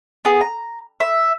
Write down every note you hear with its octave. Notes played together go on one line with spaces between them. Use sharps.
B3 G#4
A#5
E5